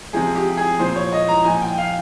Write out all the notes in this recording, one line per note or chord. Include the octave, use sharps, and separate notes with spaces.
C3 F3 G#4
G4
G#4
A#2 F3 C5
C#5
D#5
A#5
A#2 F3 G#5
G5
F5